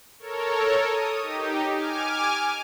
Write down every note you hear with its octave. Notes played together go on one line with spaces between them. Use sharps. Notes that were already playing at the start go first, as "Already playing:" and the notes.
A4 A#4 C#5
D#6
D#4 G4
G#5 D6 F6